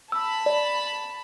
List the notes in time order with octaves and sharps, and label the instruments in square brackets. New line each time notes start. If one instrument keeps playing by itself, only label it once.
[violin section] A5 B5 [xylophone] E6
[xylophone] D5